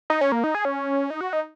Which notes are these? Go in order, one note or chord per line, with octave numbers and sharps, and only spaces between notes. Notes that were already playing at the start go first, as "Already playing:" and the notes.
D#4
C#4
A#3
D#4
G#4
C#4
D#4
F#4
D#4